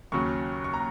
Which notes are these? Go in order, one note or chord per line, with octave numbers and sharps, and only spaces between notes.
D#2 C#3 F#3 C#6
C#6
A#5